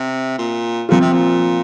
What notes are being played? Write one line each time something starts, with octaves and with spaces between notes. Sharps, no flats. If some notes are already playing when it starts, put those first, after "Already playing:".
Already playing: C3
A#2
A#2 F3 C4 F4
C3
A#2